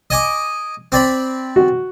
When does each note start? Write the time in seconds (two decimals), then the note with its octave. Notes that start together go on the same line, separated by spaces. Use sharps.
0.10 D#5 G#5 D6
0.92 C4 D5 B5
1.56 F#4